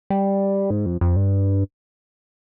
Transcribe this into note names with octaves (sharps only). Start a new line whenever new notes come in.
G3
G#2
F2
F2
G2